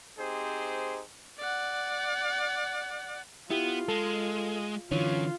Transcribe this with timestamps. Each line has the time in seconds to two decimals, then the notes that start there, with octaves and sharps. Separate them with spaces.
0.18 C4 D#4 G4 G#4 C5
1.39 D5 F#5
3.50 B3 E4 F4 G4
3.88 G#3 A4
4.91 D3 E3 F#3 C#4 F4 C#5